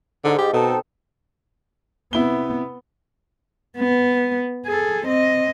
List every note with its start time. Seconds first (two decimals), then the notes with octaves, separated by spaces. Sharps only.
0.24 G#2 D3
0.38 G4
0.53 B2 C4 D#4 A4
2.13 C3 B3 E4 G7
3.77 B3
4.66 G#4 A4
5.06 C4 D#5